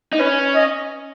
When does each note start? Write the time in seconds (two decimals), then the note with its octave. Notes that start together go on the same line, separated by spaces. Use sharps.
0.13 D#4
0.19 C#4 B4
0.55 D#5